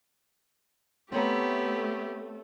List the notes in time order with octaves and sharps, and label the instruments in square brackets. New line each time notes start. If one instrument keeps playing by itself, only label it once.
[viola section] A3 [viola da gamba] B3 [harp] C4 C#5 A#5 [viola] G4